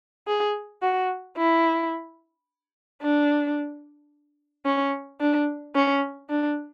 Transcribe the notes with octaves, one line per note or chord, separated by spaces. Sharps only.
G#4
F#4
E4
D4
C#4
D4
C#4
D4